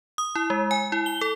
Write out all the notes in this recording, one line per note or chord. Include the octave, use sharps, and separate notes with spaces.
D#6
E4
G#3
G#5
E4
G7
A4